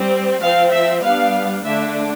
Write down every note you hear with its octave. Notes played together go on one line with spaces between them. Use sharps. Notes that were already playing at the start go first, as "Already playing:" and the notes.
Already playing: G3 C4
F3 C4 F5
E5
G3 B3 D4 F5
D3 A3 D4 E5